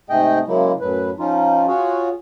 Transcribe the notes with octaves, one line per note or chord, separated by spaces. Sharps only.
G#2 C3 A3 G#4 D#5 G5
C#3 F#3 G#3 A#3 E4
F#2 A2 F#3 B4
F3 C#4 D#4 F4
F4 F#4 G#4 C#5